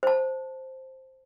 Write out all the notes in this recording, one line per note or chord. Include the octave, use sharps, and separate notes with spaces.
C5 A5